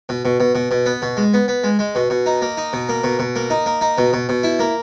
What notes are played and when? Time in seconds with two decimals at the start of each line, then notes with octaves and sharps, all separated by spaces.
0.09 B2
0.25 B2
0.40 B2
0.55 B2
0.71 B2
0.86 B3
1.02 B2
1.17 G#3
1.34 B3
1.48 B3
1.64 G#3
1.79 G#3
1.95 B2
2.10 B2
2.26 D#4
2.42 A#3
2.57 D#4
2.73 B2
2.89 A#3
3.03 B2
3.19 B2
3.36 A#3
3.50 D#4
3.66 A#3
3.81 D#4
3.98 B2
4.13 B2
4.29 B2
4.43 E4
4.59 A#3